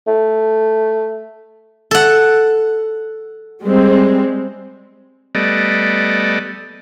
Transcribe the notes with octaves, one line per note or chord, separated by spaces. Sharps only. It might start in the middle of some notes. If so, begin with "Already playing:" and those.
A3
A4 F#5
G3 G#3 C4
G3 A3 B3 D5 D#5